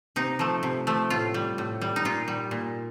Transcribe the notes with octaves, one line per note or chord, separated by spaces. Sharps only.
C3 D#4
F3 A3
C3
F3 A3
A2 F4
G3
A2
G3
D#4
A#2 F4
G3
A#2